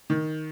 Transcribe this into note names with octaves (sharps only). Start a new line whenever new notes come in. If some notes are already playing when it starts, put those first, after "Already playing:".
D#3